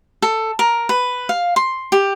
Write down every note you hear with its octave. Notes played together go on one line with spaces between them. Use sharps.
A4
A#4
B4
F5
C6
G4